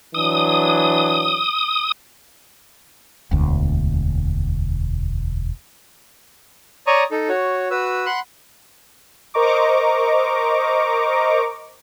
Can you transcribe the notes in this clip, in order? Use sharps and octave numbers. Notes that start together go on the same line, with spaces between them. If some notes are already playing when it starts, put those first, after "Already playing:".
E3 F#3 D4 D#6
E1 D2
C#5 D5 A#5 C#6 D#6
D#4 A4
F#4 C#5
F#4 B4 E6
F#5 B5 C6 F#6
A#4 C5 D#5 A#5 C#6 D6